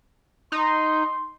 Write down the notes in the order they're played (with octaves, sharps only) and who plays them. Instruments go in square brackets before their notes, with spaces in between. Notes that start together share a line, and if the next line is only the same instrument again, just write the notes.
[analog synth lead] D#4 [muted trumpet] C6